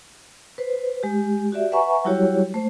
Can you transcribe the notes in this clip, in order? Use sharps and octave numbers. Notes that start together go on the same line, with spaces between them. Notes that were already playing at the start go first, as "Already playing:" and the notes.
B4 C5
G#3 G4
F#4 G4 D5 E5
B4 E5 F#5 G#5 A#5 C#6
F#3 G3 E4 F#4 G4 C#5
A3 C5